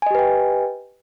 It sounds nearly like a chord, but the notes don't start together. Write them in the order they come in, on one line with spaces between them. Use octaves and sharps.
G#5 D#5 G4 B4 G5